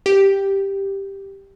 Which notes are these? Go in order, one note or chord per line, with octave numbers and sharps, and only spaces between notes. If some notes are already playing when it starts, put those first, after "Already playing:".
G4